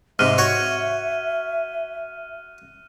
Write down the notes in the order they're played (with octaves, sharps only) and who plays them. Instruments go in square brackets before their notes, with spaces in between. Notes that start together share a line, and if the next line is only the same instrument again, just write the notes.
[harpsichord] G#2 C3 [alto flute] E5 [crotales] F6 F#6 D#7
[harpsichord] F#4 C#5